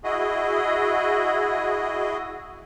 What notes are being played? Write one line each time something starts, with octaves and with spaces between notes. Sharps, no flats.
E4 F#4 G#4 D#5